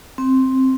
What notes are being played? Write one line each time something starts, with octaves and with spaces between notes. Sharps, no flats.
C4